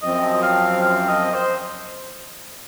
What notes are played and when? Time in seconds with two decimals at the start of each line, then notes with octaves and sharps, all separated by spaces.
0.03 F#2 F3 C4 D#5
0.43 F5
0.82 F5
1.08 D#5
1.35 C5